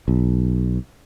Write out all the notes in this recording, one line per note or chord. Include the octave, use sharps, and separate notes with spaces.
B1